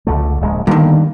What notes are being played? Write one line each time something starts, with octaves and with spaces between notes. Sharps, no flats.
C#2 D3 A3
D1 A#1 G#3
G2 D3 D#3 A#3 B3